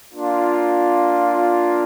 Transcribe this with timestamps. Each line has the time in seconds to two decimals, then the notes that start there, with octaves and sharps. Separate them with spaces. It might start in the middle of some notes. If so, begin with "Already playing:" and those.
0.12 A#3 D4 F4